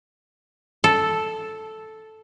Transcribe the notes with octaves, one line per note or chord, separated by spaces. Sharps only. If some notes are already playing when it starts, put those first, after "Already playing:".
A4